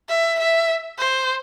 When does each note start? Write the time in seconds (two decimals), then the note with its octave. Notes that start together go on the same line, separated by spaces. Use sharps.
0.09 E5
0.39 E5
0.99 C5